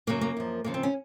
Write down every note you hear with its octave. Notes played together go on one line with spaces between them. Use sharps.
F#2 C#3 F#3 A#3
A#3
F#2 F3
D#2 C#3 F3 A#3
C4
C#4